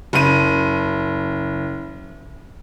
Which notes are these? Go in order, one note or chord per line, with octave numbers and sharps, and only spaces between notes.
F#1 D#7